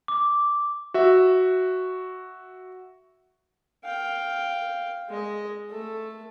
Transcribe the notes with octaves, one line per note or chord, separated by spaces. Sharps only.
D6
F#4 E5
F5 G5
G#3 D#5
A3 A4